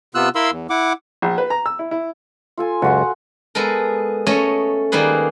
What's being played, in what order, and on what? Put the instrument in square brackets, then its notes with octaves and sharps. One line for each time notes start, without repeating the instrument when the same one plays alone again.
[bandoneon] C3 B3 F4 E6 F#6
E4 A#4 F5 B5 C6 E6
E2
E4 F#5 D6
[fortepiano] A#1
B4
A#5
E6
E4
E4
[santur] F4 A4 G#5
[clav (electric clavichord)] C#2 F#2 [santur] F4 F#4 F#5
[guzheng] G#3 B3 A4 A#4
A3 C#4 C#5 D#5 G#5
D#3 G3 A#3 G#4 B4